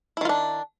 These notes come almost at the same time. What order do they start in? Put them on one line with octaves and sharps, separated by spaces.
E4 D#3 F4 D4